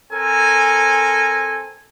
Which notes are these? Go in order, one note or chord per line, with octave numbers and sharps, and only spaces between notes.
C4 A4 A#4 G#5